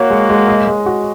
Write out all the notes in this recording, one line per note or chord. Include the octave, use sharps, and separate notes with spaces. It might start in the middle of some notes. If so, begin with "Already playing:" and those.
Already playing: A#3 F#4 C#5
G#3
G#3
D#5
G#3
F#4